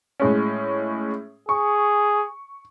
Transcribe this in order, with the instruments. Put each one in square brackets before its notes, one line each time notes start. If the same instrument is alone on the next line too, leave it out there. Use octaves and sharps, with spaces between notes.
[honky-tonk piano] A2 G#3 C#4
[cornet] G#4 [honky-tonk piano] C#6